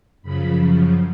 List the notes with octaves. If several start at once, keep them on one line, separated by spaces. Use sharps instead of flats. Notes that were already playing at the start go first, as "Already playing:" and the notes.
F#2 C#3 F3 B5